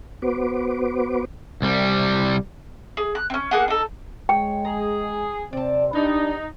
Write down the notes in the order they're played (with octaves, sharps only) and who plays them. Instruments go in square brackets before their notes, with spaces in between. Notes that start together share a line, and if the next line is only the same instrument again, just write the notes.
[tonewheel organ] B3 F#4 B4 C5 D6
[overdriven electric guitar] C2 G3
[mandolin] G#4
F#6
C4 C#4
A#3 B3 G#4 F#5
D#4 A4
[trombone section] G#3 [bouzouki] C#5 [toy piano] G5
[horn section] G#4 [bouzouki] A#5
[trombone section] C3 C4 [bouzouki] D5 A5
[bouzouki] G3 B3 [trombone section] D4 [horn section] D#4